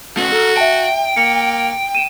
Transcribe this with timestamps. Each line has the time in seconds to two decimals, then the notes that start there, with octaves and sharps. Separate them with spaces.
0.17 A3 C#4 F#4
0.32 A4 A#5
0.57 E5 G5 A5
1.16 A#3 C#7
1.95 D#7 E7